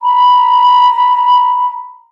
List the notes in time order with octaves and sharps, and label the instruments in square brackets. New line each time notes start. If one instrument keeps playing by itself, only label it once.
[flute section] A#5 B5